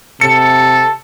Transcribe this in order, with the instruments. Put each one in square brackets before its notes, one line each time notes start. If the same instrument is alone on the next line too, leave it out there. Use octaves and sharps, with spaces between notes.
[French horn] C3 [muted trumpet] A4 [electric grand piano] C#7